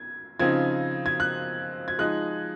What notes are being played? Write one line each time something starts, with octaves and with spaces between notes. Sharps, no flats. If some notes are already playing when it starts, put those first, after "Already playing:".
Already playing: G#6
C#3 F3 C4 D#4 G#6
G#6
F#6
G#6
F3 G#3 D#4 F#6